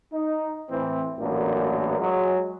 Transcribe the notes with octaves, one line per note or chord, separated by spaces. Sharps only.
D#4
A2 E3 C4
A1 F#2 A#2 A#3 B3 D4
F#3 G#3